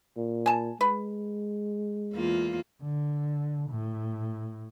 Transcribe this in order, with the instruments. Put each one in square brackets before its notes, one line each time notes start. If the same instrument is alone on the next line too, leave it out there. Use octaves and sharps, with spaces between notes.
[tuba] A#2
[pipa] G#5 A5
[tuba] G#3 [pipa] B4
[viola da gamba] E2 A#3 F4
[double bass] D3
A2